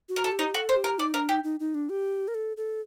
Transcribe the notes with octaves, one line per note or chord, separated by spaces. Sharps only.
F#4
A#4
A4
G4
D#4
F#4 A4
C5
G4
A#4
D#4 D5
D4 A#4
D#4 G4
D#4
D#4
D4
G4
A#4
A4
A4